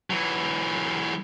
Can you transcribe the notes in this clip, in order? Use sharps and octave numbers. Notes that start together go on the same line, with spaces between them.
E3 F#3